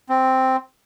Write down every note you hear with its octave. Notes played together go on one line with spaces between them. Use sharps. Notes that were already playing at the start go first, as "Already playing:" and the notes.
C4